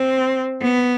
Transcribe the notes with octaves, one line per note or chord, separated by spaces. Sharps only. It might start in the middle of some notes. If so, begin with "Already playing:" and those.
Already playing: C4
B3